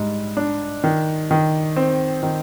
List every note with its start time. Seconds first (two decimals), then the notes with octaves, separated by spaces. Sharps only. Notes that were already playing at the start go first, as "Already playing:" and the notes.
Already playing: G#2 G3
0.37 D4
0.84 D#3
1.31 D#3
1.76 C4
2.23 D#3